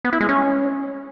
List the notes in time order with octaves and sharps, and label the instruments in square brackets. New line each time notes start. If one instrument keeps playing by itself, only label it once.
[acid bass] B3
E4
G#3
C#4